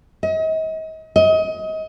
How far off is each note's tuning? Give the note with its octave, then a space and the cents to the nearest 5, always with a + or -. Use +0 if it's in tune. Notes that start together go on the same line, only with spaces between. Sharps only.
D#5 +40
D#5 +30